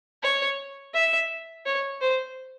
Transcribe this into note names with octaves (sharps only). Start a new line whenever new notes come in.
C#5
E5
C#5
C5